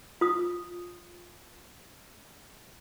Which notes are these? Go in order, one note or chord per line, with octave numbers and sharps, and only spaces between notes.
F4 D#6